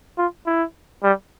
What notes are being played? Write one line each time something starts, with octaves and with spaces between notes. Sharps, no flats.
F4
E4
G3